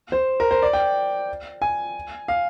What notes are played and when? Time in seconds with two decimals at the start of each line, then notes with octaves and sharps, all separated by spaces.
0.12 C5
0.40 A#4
0.51 C5
0.62 D5
0.73 G5
1.62 G#5
2.28 F5